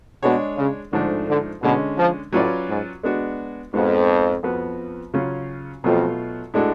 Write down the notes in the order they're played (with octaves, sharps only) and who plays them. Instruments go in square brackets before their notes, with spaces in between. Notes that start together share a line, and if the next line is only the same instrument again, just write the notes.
[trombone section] B2 [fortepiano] G#3 D4 G#4 C#5
[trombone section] C#3
[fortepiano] G#2 F3 A3 D4 [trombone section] D3
[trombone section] D3
[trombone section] B2 [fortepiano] D3 G#3 C#4
[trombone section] F3
[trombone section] A2 [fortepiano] F#3 C#4 F4 B4 D5
[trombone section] G#2
[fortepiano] G#3 B3 D4 F#4
[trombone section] F2 [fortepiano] G#2 G#3 B3 F#4
[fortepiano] F2 F3 B3 F#4 B4
C#3 F#3 C#4 F4
[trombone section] F2 [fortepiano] B2 F#3 A3 F4
[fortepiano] A2 G#3 D4 F#4 A4